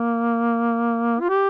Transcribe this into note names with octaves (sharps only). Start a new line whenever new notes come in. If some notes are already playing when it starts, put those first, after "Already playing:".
Already playing: A#3
F4
G4